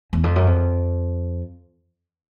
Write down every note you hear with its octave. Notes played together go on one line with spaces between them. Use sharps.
E2
F2
F#2
F2